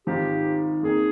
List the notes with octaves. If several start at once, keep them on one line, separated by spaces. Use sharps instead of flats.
G#1 G#2 F3 G4
F2 D#3 A#3 G#4